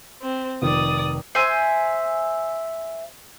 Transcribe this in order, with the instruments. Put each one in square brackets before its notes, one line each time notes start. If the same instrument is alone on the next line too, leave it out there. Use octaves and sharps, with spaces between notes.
[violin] C4
[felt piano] F1 D#3 [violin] D5 D#6
[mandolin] C5 E5 G#5